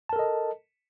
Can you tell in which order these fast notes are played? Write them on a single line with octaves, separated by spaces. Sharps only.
A5 A#4 A4 D#5